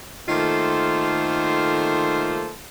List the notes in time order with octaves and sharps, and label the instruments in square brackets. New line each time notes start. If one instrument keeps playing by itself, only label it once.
[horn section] D#3 A3 A#3 F4 A4 C5